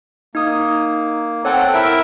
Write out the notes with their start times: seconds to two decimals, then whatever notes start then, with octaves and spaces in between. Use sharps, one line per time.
0.35 A#3 D#4 D#6
1.45 C4 A4 C#5 F#5 G5
1.74 E4 A#4 E5 E6 D7